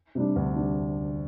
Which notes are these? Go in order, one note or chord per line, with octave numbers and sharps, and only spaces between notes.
C3 G3 D4
D2
G3 D4